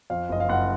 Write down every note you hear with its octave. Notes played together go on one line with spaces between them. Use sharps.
F2 F5
F#1 D#5
F5
F#1 F#5